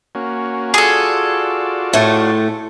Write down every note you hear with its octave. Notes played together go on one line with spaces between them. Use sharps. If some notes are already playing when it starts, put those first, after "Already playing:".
A#3 C#4 F#4
F4 F#4 G#4 A4 D5
A2 A3